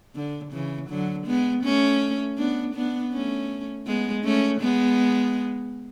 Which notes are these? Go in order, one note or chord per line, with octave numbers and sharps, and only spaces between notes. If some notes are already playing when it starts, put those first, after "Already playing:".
D3
C#3 E3
D3 F#3
G#3 B3
A3 C#4
B3 D4
B3 D4
A3 C#4
G#3 B3
A3 C#4
G#3 B3